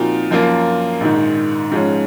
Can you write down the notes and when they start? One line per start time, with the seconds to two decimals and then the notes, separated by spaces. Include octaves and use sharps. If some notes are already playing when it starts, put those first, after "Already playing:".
Already playing: A#2 F3 C4 D#4 F#4
0.31 F#2 F3 A#3 F4
1.00 A#1 G#2 D#3
1.71 G#2 F3 G#3 C#4